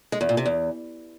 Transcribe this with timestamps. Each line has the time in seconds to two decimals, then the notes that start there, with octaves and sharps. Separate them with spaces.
0.12 G#3
0.21 E2
0.29 A#2
0.37 C3
0.46 E2